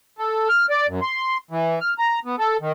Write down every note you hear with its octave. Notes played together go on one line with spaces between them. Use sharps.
A4
F6
D5
F#2
C6
E3
F6
A#5
B3
A4
D#3